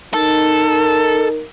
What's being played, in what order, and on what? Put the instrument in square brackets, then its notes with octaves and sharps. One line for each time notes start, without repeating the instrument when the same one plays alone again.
[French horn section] D#4 A#4 [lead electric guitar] A4